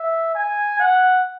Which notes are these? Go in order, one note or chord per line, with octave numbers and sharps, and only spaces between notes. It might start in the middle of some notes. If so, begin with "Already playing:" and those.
Already playing: E5
G#5
F#5